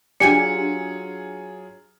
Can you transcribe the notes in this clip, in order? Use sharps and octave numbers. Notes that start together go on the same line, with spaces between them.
F#3 D4 F4 G4 G#4 G#5 C#7